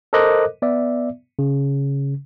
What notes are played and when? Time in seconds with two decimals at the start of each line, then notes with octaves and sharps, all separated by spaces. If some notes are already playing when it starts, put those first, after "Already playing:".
0.13 A4 A#4 C5 D#5 D6 F#6
0.62 B3 D5 E5
1.39 C#3